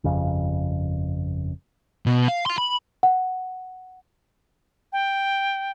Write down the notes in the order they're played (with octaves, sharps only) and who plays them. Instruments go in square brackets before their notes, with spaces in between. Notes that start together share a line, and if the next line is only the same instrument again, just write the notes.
[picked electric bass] G1 F2 C#3
[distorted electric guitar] B2
F5
F5 C6
B5
[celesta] F#5
[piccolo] G5